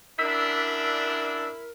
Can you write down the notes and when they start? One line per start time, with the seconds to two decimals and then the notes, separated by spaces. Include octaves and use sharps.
0.19 F#2 D4 E4 A#4 E6 B6